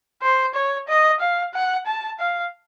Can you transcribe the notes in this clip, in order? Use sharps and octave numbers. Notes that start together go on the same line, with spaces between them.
C5
C#5
D#5
F5
F#5
A5
F5